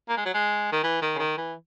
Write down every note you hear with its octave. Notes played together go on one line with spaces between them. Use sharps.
A#3
G#3
F#3
G#3
D#3
E3
D#3
C#3
D#3
E3